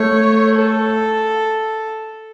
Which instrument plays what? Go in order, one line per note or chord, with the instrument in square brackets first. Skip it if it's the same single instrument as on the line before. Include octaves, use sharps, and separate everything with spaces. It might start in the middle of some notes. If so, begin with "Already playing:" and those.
Already playing: [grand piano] A3 [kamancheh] C#5
[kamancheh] A4